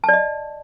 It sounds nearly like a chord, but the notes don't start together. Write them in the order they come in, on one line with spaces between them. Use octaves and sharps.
A5 D5 D#5